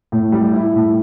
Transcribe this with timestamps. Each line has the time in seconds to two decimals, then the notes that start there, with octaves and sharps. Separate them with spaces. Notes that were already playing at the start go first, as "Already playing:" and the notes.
0.12 A2
0.32 G3
0.53 E4
0.75 A2